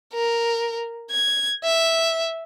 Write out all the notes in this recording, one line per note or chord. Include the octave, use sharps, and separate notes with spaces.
A#4
G#6
E5